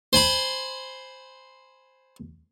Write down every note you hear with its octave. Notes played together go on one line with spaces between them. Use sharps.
C5 G#5 B5 C6